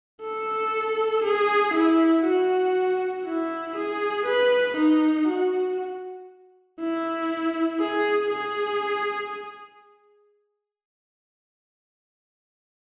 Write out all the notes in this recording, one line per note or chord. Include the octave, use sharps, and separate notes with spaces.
A4
G#4
E4
F#4
E4
G#4
B4
D#4
F#4
E4
G#4
G#4